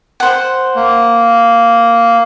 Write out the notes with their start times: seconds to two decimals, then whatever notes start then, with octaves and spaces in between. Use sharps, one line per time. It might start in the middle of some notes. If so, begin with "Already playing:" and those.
0.20 C5 F#5
0.76 A#3